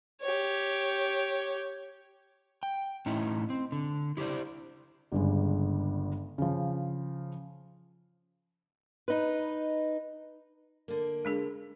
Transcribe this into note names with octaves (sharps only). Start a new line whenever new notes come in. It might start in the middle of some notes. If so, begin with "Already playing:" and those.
G4 C#5
G5
A2 C#4 D#4 E4
C4
D3
E4 G4 B4 C5 D5
G1 G2 C#3 G#3
C#3 F3
D#4 B4
D3 A#3
G#3 D4 G#4